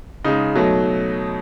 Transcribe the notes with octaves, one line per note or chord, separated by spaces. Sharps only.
C#3 G#3 D#4
B2 F#3 A3